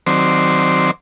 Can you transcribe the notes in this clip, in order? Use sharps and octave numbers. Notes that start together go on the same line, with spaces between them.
D#3 F#3 C4 C5 D5